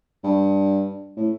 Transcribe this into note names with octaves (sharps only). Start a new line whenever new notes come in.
G2
A2